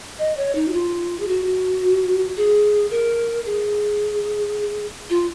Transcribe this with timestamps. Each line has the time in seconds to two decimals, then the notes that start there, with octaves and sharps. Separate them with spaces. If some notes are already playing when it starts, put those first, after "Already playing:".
0.19 D#5
0.37 C#5
0.55 D#4
0.68 F#4
0.73 F4
1.20 G#4
1.28 F#4
2.37 G#4
2.91 A#4
3.46 G#4
5.10 F4